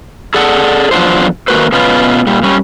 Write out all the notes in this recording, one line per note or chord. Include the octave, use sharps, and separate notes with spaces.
G#4 A4 D5 F#5
E2 F3 F#3 D4 F4 C5
D#3 A#3 C4 F#4 B4 C5
B2 B3 C#4 F4
A#2 G3
G3 C#4